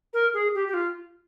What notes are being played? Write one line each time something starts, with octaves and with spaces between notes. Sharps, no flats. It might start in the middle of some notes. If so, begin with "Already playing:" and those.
A#4
G#4
G4
G4
F4